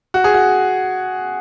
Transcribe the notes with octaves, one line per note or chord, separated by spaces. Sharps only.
F#4
G#4
F#4